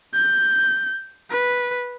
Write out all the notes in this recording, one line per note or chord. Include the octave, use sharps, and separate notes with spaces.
G6
B4